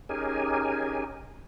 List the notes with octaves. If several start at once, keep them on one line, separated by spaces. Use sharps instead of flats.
C#4 D#4 G4 G#4 A#4 G#5